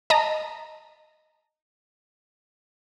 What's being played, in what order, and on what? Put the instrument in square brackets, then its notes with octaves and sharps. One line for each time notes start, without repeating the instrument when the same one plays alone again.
[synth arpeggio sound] D#5 A5 A#5